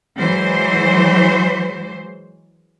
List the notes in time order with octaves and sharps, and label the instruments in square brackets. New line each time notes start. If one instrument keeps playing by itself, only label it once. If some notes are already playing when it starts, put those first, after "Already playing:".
[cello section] E3 F#3 G#3 C5